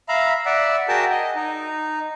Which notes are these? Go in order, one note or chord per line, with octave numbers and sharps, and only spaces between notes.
E5 F5 A#5 B5
D5 E5 F#5
F#4 G#4 A#4 G5 A5
D#5
D#4